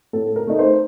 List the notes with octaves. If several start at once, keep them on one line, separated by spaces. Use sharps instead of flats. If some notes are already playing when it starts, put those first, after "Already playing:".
A2 A4
A#4
A3 D#4
C5